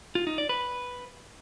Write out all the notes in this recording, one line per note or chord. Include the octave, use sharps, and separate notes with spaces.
F4
D#4
D5
B4